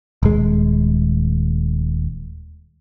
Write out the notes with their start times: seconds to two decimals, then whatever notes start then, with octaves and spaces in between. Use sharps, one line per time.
0.23 D#1 G#3